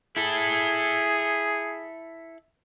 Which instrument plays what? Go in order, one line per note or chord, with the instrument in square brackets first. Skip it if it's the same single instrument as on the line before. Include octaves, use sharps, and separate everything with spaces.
[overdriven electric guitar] E4 A4 [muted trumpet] G#4